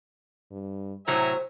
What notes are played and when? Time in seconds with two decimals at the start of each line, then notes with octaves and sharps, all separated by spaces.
0.51 G2
1.08 A2 C3 F#3 C5 E5 G#5 A#5